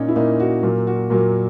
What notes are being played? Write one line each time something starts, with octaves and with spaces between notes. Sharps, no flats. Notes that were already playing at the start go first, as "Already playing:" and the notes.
Already playing: A#2 A#3 C#4 D#4
E4
A#2 A#3 D#4
F#4
A#2 F#3 A#3
F#4
A#2 F#3 A#3